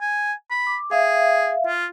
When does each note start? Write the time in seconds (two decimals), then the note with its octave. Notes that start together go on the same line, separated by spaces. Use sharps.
0.01 G#5
0.51 B5
0.67 D6
0.91 G#4 E5 F5
1.67 F4